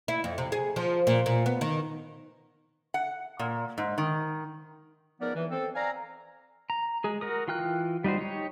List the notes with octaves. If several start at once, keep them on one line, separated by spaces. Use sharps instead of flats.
E4
F2
C3
G#4
F3
A#2
A#2
B3
D#3
F#5
A#2
G#2
D#3
C#2 F3 B3 D#4 A#4 D5
E3
C4 A4
D5 F5 G#5 A#5
A#5
G#3 G#4
F#4 A#4 D#6
E3 F4 G5 F6 F#6
G3 D#4 F#4 C5
D#4 G4 C#5